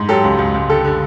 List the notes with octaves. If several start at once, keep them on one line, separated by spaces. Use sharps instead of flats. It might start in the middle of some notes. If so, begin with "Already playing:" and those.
Already playing: G#2
F#3 G4 A4
C#2
C#2
C#2
D3 G4 A4
D3